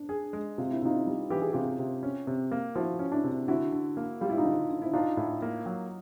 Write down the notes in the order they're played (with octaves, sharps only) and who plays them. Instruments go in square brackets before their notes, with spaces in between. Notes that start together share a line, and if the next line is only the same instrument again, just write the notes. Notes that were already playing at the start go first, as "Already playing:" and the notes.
Already playing: [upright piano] D4
[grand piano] G#4
G#3
[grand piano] C3 [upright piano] F4
[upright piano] E4
[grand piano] C3 [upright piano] D#4 F4
[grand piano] G3
[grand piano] E3 [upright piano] G4
[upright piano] G#4
[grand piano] C3 [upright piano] F4 G4
[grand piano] C3
C#4
C3
A#3
[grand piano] F3 [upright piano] E4 F#4
[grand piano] C#4
[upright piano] D4 E4
[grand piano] C3
[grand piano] D3 [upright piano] E4 F#4
[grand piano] D3
A#3
[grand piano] G3 [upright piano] F4
[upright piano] E4
D#4 F4
[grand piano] D3
D3
[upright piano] E4
[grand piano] D4 [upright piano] D#4 F4
[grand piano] A2
A#3
F#3